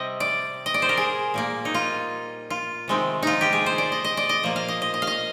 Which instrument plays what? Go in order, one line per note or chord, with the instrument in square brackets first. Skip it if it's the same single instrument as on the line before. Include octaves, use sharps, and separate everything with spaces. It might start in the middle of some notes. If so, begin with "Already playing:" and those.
Already playing: [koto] C3 G3 C4 D#5
D5
D#5
D5
C5
A#4
G#4
A#2 G3 A#3
D#4
F4
F4
C3 D#3 G#3 C4
D#4 F4
G4
G#4
C5
D5
D#5
D#5
D5
D#5
A#2 F3 A#3
F5
D#5
D#5
D#5
F5
D#5